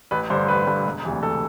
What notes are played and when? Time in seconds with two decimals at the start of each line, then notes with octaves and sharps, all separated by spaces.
0.11 A1 B4
0.30 G2 D3 C5
0.48 A1 B4
0.67 G2 D3
0.86 E1
1.05 D2 C3 E3
1.23 E1 A4